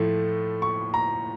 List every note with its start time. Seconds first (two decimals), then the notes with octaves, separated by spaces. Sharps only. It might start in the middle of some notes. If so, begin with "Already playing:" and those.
Already playing: A2 F3 A3
0.62 C#6
0.94 A#5